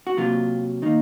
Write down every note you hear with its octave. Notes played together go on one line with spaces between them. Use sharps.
F#4
C3 F#3 A#3 F4
D#3 A#3 D#4